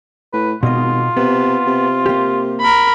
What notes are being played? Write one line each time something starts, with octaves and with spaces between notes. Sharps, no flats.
A2 B4
G#1 B2 F4 D#5
C3 B3
C3
A#3 G4
A#4 B5